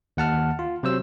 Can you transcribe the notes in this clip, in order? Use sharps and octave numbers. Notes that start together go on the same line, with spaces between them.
D#2 F#5 A5 F6
F4
C3 F#3 C5 E6